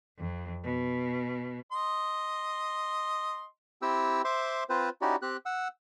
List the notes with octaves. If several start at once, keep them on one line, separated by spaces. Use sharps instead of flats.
F2
B2
D#5 C6
C4 E4 G4 G5 E6
C5 E5 C6 D6
C4 F4 B4 C5
C#4 D#4 E4 F#4 G4 D5
C4 G4 F#6
F#5 E6